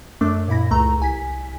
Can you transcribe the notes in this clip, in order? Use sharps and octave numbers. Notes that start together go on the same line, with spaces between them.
F#2 A3 D4 D6
F#2 A#2 E4 B5 A#6
C#2 A3 A#5
C2 G#5 B6